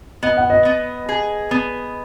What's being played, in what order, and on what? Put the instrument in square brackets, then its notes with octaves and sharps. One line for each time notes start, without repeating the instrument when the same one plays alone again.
[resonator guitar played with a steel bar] B3 [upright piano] D#5
[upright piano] F#5
D#5
[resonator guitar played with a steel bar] B3
G#4
B3